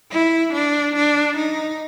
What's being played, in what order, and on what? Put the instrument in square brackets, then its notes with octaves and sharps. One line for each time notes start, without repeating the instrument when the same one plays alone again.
[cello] E4
D4
D4
D#4